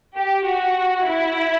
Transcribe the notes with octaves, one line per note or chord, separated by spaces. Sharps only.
G4
F#4
E4